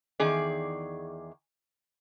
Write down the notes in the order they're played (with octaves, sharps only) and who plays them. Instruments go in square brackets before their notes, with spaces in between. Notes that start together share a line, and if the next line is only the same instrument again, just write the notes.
[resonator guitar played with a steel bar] E2 D#3 G#4 D5